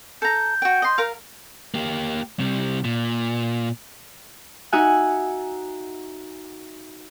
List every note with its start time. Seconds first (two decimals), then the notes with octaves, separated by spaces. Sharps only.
0.22 A4 A#5 G6
0.62 F#4 G5
0.82 D#5 C6
0.98 A#4 F5
1.74 A#3 G4
2.40 C3 G3
2.85 A#2
4.72 D#4 F#4 E5 F#5 G#5